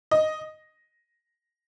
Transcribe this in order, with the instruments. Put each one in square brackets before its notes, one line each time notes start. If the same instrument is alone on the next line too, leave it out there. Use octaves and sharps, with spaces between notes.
[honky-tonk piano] D#5